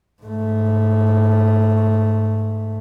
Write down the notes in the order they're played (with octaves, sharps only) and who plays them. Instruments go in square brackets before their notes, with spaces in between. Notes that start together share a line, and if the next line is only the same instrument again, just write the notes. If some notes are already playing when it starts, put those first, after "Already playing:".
[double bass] G#2 A3